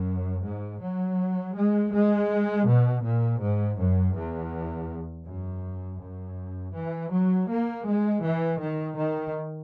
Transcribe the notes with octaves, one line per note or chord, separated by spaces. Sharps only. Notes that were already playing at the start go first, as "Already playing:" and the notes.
Already playing: F#2
G#2
F#3
G#3
G#3
B2
A#2
G#2
F#2
E2
F#2
F#2
E3
F#3
A#3
G#3
E3
D#3
D#3